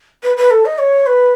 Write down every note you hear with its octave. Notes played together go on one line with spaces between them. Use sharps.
B4
B4
A4
D#5
C#5
B4